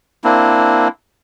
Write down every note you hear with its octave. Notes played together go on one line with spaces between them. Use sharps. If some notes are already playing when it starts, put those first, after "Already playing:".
A#3 C4 D4 E4